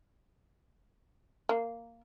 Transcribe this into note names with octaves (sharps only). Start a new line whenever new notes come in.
A#3